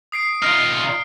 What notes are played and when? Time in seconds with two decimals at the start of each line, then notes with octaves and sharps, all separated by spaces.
0.12 D#6 C7 D7
0.42 D#4 F4 F6 D7